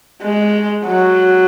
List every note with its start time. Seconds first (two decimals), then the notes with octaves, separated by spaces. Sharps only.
0.22 G#3
0.85 F#3